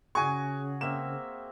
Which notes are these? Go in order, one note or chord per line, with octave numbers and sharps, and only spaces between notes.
C#3 F#4 G#4 G#5 C#6
A#3 C4 E5 E7